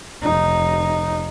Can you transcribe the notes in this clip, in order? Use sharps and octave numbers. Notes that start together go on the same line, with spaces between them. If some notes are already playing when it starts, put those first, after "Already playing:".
F1 D#4